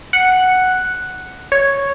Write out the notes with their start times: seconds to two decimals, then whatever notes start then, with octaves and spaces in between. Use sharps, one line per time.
0.13 F#5
1.52 C#5